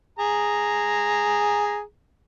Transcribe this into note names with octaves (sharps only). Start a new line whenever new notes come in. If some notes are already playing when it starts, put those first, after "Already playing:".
G#4 A#5